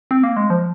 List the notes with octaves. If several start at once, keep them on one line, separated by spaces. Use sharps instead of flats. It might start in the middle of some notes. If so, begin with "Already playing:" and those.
C4
A#3
G#3
F3